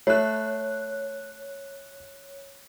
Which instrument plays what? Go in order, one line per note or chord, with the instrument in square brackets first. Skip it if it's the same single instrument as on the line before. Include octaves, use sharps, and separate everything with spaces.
[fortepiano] A3 [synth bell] C#5 F#6